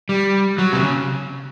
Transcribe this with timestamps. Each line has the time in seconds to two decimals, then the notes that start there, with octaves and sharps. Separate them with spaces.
0.09 G3
0.58 F#3
0.72 C3
0.82 C#3